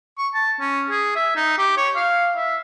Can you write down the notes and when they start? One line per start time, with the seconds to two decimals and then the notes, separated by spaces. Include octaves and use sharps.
0.18 C#6
0.34 A5
0.60 C#4
0.89 G#4
1.16 E5
1.36 D#4
1.58 G4
1.77 C#5
1.96 F5
2.36 E5